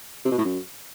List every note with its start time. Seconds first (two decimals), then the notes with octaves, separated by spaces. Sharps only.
0.25 C3
0.32 B2
0.38 A2
0.45 F#2